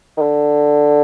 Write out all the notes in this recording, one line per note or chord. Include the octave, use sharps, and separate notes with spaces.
D#3
D3